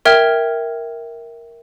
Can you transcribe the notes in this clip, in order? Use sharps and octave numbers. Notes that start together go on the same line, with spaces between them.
A#4 E5 G5 F6 G#6